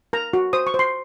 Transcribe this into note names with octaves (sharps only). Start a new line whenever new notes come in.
A#4 A#5
F#4
C5 D#6
C#6
C5
C6